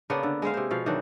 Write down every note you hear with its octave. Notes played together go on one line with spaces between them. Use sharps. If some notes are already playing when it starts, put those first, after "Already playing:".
C#3 A#3 B3 D4
D3
G#3 G#4 C5 F5
C3 C5
B2 F3 F5
D#3 E3 F#3 D4